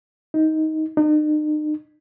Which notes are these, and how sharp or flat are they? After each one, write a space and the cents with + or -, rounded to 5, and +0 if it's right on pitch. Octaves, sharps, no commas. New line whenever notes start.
D#4 +15
D#4 -40